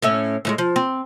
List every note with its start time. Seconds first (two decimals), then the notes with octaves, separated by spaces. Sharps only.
0.02 A2 C#4 E5
0.45 A2 F3 G#3
0.58 F3
0.76 C4